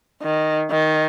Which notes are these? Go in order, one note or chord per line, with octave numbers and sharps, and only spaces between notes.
D#3
D#3